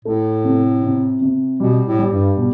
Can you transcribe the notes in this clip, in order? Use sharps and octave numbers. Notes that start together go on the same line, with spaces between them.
A2 A3
C3
C3
C3
B2 G3
A2
G3
G2
B2